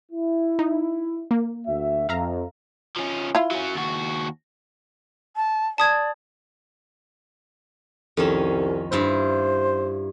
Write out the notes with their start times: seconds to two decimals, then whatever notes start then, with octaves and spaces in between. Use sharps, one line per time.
0.11 E4
0.59 D#4
1.31 A#3
1.66 D2 F#4 E5
2.09 F2 E5 F5 A#5
2.97 F3 C#4
3.35 E4 F4
3.51 F#3 C#4
3.75 D#2 F#4
5.36 A5
5.78 D5 A5 D#6 G#6
8.17 C2 F2 D#3 C#4
8.92 G2 E4 F4 C5